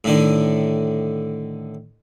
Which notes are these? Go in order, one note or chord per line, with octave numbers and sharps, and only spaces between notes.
A2 D3 D#3